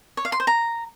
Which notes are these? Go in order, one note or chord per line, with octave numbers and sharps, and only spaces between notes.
C#5
F5
C6
C5
A#5